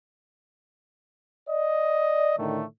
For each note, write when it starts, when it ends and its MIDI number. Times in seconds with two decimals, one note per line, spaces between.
1.49 2.34 74
1.49 2.34 75
2.38 2.62 45
2.38 2.62 50
2.38 2.62 51
2.38 2.62 57